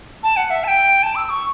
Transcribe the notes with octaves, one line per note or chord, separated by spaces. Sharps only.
A5
F#5
E5
A5
G5
A5
E6
C#6